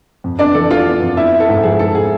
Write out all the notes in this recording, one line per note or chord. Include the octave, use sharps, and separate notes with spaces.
F2
B3 D4 D5
E3 A4
E3 F4 F5
B3
F2
B3 E4 E5
B3
A4
G#2
F3 G#4
G#2 A4
G#4